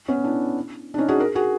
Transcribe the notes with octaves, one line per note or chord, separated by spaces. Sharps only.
B3 C#4
D4 E4
D4
C#4 D#4
F#4 G#4
G#4 A#4
F#4 G#4